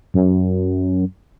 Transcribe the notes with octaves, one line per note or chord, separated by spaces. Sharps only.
F#2